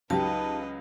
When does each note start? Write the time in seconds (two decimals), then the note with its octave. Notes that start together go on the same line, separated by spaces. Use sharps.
0.10 C#2 F#3 D#4 G4 B4 D#5 A5